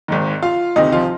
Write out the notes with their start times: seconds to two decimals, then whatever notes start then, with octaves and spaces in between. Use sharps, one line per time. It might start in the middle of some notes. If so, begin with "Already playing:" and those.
0.08 G#1 G#2 D#3
0.42 F4 F5
0.76 D2 C3 D#3 D#4 D#5
0.92 F3 F4